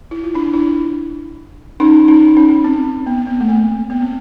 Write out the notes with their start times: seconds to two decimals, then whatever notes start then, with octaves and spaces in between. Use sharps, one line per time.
0.11 E4
0.24 F4
0.34 D4 E4
0.54 D4 E4
1.80 C#4 D#4
2.08 C#4 D#4
2.37 C#4
2.64 C4
3.06 B3
3.17 C4
3.27 B3
3.41 A3
3.48 A#3
3.90 B3
4.02 C4